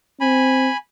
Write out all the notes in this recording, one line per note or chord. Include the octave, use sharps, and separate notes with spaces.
C4 G#5 B5